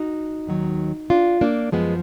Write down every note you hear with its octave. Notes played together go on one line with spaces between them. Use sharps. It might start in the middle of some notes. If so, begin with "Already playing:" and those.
Already playing: D#4 F#4
D#2 D#3 F#3
D4 F4
A#3 D4
F#2 F3 G#3 B3